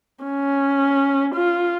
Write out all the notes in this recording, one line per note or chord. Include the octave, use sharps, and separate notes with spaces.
C#4
F4